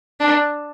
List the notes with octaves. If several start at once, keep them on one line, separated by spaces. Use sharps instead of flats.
D4